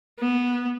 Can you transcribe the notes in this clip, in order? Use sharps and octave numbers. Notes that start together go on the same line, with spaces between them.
B3